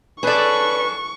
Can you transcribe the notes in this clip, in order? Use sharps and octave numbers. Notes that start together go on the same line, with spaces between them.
C#4 G#4 A4 B4 D5 C#6